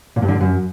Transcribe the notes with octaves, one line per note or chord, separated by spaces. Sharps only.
A#2
G2
D3
G2
F#2